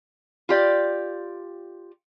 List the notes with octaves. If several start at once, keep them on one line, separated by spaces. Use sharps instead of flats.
F4 G4 D5